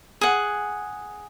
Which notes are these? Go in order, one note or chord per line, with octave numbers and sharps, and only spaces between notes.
G#4 F#5